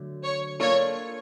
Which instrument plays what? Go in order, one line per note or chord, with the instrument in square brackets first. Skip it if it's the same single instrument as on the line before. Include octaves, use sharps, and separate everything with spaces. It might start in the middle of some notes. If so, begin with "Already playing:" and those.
Already playing: [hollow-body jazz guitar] D3 F#3 A3
[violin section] C#5
[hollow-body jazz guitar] A#3 D4 F4 A4 [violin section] C#5